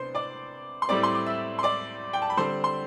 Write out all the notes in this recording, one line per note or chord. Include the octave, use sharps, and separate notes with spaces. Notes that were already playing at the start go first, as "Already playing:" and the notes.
Already playing: C3 B3 D4 C5 C6
D5 D6
C6
A2 G3 C4 D5 D6
C6
D6
E5 E6
C6
D5 D6
G5
A5
B5
D3 G3 C4 C5 C6
C6